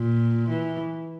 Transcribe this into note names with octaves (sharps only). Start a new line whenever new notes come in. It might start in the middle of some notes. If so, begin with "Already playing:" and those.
Already playing: A#2
E3